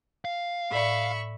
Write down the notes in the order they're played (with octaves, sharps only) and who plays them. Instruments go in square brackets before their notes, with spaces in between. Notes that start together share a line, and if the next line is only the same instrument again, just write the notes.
[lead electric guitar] F5
[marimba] A2 D5 [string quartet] E5 B5 C#6